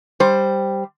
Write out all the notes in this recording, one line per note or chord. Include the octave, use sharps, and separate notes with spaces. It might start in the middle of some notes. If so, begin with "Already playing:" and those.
G3 C5